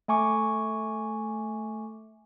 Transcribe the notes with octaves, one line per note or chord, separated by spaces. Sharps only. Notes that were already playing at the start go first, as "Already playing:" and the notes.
A3 G#5 C#6 D6